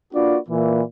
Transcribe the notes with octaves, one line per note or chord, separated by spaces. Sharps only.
A#3 D4 F4 F#4 B4 D5
A#2 E3